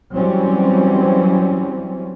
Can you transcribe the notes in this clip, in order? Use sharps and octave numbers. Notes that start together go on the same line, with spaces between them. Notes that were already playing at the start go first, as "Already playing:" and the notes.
E3 F#3 G3 C4 C#4